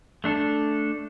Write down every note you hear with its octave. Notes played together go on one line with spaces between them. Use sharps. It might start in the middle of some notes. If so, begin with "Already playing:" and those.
A3 D4 A4